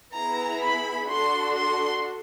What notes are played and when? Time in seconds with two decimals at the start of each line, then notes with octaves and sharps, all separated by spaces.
0.14 B3 E4 G#4 A#5
0.61 B5
1.09 D4 F#4 A4 C6
1.56 C6